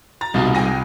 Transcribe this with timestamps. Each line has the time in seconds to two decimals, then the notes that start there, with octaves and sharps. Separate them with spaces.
0.21 A#5 A6
0.34 C2 B2 G3 D#4 F4
0.55 G5 G#5 A#6